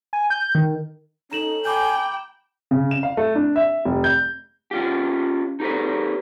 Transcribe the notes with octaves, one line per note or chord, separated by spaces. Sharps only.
G#5
G6
D#3
C#4 D#4 A4 A#5 E7 F#7
G5 G#5 B5 D6 G6
C#3
E7
F5
A3
D4
E5
F1
G6
C#4 F4 G4
D#4 G4 A4 B4